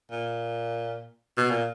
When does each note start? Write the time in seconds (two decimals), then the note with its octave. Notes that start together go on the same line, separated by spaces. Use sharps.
0.11 A#2
1.37 B2
1.50 A#2